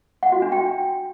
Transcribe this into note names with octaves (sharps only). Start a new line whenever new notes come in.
F#5
F#4
D4
G5